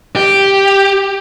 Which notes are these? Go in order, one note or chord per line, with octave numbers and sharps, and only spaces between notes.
G4